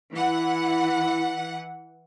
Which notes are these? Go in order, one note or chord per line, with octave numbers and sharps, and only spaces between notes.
E3 E4 F#5